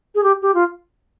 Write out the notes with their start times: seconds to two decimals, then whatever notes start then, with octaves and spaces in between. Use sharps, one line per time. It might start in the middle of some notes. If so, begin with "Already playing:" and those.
0.15 G#4
0.23 G4
0.42 G4
0.54 F4